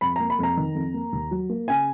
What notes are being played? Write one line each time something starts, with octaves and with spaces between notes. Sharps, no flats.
F2 B5
A#3 A#5
B5
F2 A#5
D#3
F2
A#3
D#2
F#3
A#3
C#3 G#5